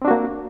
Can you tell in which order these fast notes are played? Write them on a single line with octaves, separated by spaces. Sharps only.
C4 D4 F#4 A#3